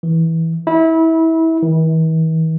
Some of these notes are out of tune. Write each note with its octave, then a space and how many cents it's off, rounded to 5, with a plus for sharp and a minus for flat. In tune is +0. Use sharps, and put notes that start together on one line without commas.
E3 -15
E4 -25
E3 -45